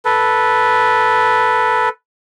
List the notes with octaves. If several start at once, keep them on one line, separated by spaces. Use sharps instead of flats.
A4 B4